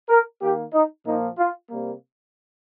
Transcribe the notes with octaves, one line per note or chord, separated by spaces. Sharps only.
A#4
D#3 A#3 G4
D#4
A#2 F3 A#3 D#4
F4
C3 G3 A#3